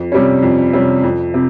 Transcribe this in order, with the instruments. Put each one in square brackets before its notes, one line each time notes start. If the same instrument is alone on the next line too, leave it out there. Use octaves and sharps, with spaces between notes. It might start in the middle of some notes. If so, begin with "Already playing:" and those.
Already playing: [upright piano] F2
C3 G3 C#4
F2
C3 G3 C#4
F2
C3